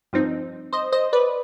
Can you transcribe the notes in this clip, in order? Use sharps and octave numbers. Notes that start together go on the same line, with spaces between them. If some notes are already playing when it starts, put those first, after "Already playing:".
G2 F3 C4 D#4
C5 D#5
C5 D#5
B4 D5